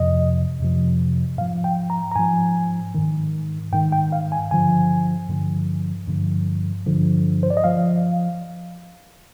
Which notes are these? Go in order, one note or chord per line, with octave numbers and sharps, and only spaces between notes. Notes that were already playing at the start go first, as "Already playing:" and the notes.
Already playing: F2 C3 F3 D#5
F2 C3 F3
G#2 F3 F5
G5
A#5
A#5
G#2 F3 G#5
G#2 D#3
G#2 D#3 G5
G5
F5
G#5
G2 D3 F3 G#5
G2 D3 F3
G2 D3 F3
G2 D3 F3
C5
D5
D#5
F3 F5